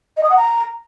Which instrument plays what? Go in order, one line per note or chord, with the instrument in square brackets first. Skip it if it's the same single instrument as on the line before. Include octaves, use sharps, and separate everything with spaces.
[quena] D#5
D#6
F#5
A#5